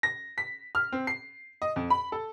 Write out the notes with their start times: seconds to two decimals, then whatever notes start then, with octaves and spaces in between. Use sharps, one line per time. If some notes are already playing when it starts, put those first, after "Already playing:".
0.03 A#6
0.38 B6
0.75 F6
0.92 C4
1.07 C7
1.62 D#5
1.76 F2
1.90 B5
2.12 A4